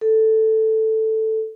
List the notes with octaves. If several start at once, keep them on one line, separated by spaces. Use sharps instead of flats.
A4